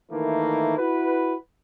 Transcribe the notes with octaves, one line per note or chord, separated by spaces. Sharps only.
D#3 E3 A3 A#3
E4 F#4 B4